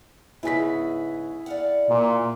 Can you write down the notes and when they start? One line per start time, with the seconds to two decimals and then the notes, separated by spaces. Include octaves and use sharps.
0.43 G#2 C#3 B3 E4 G#4 B6
1.46 D5 F5 F#5
1.89 A#2